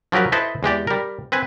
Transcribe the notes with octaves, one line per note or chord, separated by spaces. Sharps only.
F3 F#3 G4 A#4 B4
E4 A4 B4 C5 D#5
E2 G#3 G4 D5
G3 A#4
C4 B4 G#5